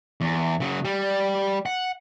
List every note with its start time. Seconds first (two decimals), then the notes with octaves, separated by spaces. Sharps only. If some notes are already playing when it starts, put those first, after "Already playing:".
0.21 E2
0.60 C#3 F#3
0.85 G3
1.66 F#5